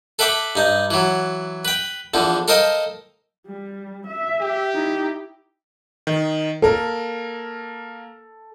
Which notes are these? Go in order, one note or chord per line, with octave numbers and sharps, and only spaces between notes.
A4 B4 E5 G5 D6
G2 D#4
E3 F#3
B4 G5
E2 D3 F3
A4 A#4 C5 D#5 F5 G5
G3
E5
G4
D#4 E4
D#3
A#3 A4 A#4